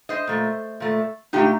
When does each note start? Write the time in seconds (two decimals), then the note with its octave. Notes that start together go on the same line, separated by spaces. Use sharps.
0.09 C5 D#5
0.27 A#2 A3
0.80 A#2 A3
1.33 A#2 A3 D#4 G4